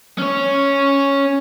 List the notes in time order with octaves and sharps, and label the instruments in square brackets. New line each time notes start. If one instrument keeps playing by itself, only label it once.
[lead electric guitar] C#4 C#5